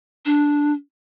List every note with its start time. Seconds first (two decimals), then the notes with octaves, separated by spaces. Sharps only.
0.25 D4